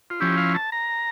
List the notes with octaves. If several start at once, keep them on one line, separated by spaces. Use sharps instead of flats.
F4
F3 C#4 E4 G4
F5
A5
A#5